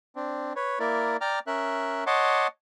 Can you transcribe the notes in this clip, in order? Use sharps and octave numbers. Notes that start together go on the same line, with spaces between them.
C4 D4
B4 C#5
A#3 E4 A#4 D5
D5 G5 A#5 D6 F6
C#4 A#4 E5 F#6
C#5 D#5 F#5 A5 C6 D6